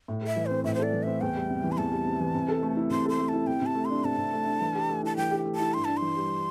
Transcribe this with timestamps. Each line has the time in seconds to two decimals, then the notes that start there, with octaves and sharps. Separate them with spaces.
0.08 A2
0.22 A4
0.27 E5
0.36 E3
0.46 C4 C5
0.64 A2 E5
0.74 C5
0.79 A4 D5
0.93 E3
1.03 C4 E5
1.21 E2 G5
1.36 G3
1.50 C3
1.64 E3
1.72 C6
1.78 E2 A5
1.92 G3
2.06 C3
2.20 E3
2.34 C3
2.48 A4
2.63 A3
2.77 E4
2.91 C3 C6
3.05 A4 C6
3.19 A3
3.29 E4 A5
3.47 C3 G5
3.61 C3 A5
3.75 A3
3.85 C6
3.90 D4
4.04 C3 A5
4.18 C3
4.33 A3
4.47 D4
4.60 E3
4.75 G4
4.89 A3
5.03 E4 A5
5.17 E3 G5
5.31 G4
5.45 A3
5.55 E4 A5
5.74 G2 C6
5.85 D4 A5
5.97 E3 C6
6.16 G3